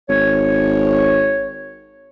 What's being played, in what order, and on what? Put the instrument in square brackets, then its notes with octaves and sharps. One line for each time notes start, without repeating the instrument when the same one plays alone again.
[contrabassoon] G#1 [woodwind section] C#5